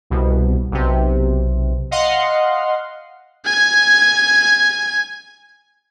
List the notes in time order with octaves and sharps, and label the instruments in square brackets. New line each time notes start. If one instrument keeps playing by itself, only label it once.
[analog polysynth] C2 B2
B1 C3
D#5 F5 F#5 C6
[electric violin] G#5 G#6